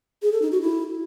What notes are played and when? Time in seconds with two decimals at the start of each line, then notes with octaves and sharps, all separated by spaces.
0.22 G#4
0.32 A4
0.42 D#4
0.52 F#4
0.61 E4